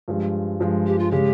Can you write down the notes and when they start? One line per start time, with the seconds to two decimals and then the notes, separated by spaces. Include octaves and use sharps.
0.08 G2 F3 G#3
0.60 G2 F3 G#3
0.87 G4
0.99 F4
1.11 C#3 G#3 G4